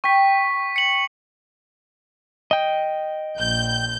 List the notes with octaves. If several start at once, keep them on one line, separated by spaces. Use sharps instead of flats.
G5 C#6 B6
C#7 F#7
D#5 G5
A#1 G6